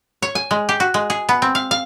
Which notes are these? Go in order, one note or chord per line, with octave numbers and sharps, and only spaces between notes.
C#5
G#5
G#3
G4
F#4
G#3
G#4
B3
C4
F5
F5